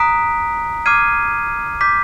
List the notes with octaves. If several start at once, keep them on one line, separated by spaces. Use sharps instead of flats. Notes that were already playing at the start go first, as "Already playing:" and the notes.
Already playing: A#5 D#6 F#6 B6 D7
D6 F6 G#6 C7 D#7
D6 G6 B6